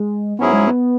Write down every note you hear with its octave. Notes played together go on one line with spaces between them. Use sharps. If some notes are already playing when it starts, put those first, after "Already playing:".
Already playing: G#3
G#2 F#3 B3 C#4 E4 G#4
G#3
B3